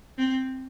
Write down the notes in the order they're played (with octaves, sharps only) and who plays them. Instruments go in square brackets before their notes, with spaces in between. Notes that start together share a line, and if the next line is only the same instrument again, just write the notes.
[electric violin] C4